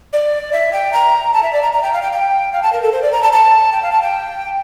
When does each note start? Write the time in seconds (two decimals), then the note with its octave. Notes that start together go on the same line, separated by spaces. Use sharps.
0.13 D5
0.53 E5
0.73 G5
0.93 A#5
1.33 A5
1.43 E5
1.53 D5
1.63 A#5
1.73 A#5
1.83 G5
1.93 F5
2.02 G5
2.12 G5
2.53 F5
2.63 A5
2.73 A#4
2.83 A4
2.92 C5
3.02 D5
3.12 A#5
3.23 A5
3.33 A5
3.72 G5
3.83 F5
3.92 A5
4.02 G5